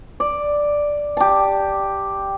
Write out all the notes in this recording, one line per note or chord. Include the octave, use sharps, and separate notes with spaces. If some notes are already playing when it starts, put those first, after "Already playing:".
D5
G4 A5